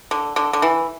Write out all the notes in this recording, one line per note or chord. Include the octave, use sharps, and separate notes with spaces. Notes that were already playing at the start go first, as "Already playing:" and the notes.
D3
D3
D3
E3